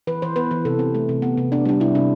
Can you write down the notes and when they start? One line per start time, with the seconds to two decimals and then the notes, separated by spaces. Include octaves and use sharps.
0.07 E3 B4
0.22 E3 C5
0.36 B3 B4
0.51 E3
0.65 C3 A4
0.79 C4
0.95 A3
1.09 C3
1.22 B3
1.37 C3
1.52 B3 D4
1.65 G3 D4
1.80 C3 E4
1.95 C3 D4